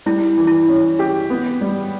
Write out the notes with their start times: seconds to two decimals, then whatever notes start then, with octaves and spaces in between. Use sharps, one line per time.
0.06 G3 E4
0.37 E3
0.47 E4
0.69 C#4
0.99 G4
1.30 B3
1.61 G3